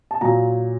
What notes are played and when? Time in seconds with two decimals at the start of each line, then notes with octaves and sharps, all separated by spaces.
0.11 A5
0.21 A#2 F#3 A#5